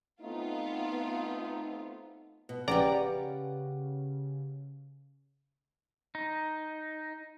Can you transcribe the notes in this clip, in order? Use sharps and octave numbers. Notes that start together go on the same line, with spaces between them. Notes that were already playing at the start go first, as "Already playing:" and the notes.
A3 B3 C4 D#4 F4
B2
A#1 C#3 G4 B4 D5 F#5 A#5
D#4